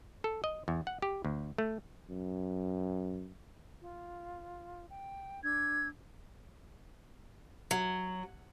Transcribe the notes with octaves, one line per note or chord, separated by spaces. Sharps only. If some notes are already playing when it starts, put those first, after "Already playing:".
A4
D#5
E2
F#5
G4
D2
A3
F#2
F4
G5
D4 E6 G#6
F#3